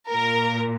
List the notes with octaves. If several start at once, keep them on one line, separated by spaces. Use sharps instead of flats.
A#2 A#4